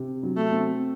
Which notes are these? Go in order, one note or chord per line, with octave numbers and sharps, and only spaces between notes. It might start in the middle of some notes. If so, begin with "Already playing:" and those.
Already playing: C3
F#3
A3
C4